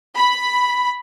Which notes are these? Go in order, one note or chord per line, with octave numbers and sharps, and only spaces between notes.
B5